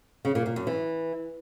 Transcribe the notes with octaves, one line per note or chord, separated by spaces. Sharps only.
C#3
A#2
A#2
F#2
E3